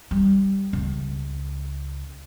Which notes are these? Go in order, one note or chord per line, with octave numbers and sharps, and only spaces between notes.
G3
C#2